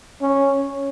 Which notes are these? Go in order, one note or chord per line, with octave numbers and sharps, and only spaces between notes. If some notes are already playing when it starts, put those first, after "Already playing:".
C#4